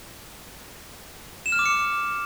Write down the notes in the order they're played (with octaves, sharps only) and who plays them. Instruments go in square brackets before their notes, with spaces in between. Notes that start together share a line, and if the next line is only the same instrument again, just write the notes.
[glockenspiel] E7
F6
D6
C#7